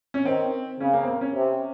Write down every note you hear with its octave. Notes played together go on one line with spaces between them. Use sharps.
C#4
D#3 C4
C#3 C#4
A#3
C4
A#3
C#4
C3